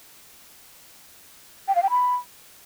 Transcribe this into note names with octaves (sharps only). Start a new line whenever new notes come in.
G5
F5
G5
B5